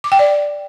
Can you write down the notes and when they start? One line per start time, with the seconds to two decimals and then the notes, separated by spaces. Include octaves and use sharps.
0.04 D6
0.12 G5
0.19 D5